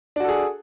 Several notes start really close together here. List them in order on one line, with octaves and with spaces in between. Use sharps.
D4 F#4 A4 G#4